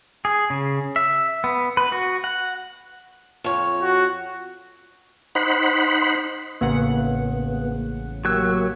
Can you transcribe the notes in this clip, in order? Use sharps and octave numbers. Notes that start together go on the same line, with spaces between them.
G#4
C#3
E5
B3
B4
F#4
F#5
F2 C#5
F#4
D#4 C5 F#5 B5
A1 C#3 A#3 B3 F#5
F#3 A#3 G4 E6 F#6 G#6